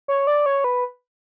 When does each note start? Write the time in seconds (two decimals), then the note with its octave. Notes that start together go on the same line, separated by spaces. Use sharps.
0.08 C#5
0.27 D5
0.46 C#5
0.64 B4